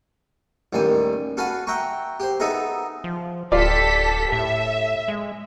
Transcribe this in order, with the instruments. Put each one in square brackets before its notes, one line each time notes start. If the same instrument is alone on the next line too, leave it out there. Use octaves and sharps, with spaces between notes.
[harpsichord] A1 D#2 G3 G#5
F#4 A4 B4 F5 F#5 G#5
E5 F#5 G5 A#5 C#6
G4 C5
B3 D#4 G#4 A4 E5 A#5
[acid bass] F3
[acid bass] D1 [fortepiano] F4 D5 [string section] G4 A4 B6
[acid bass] A2 [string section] E5
[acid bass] G#3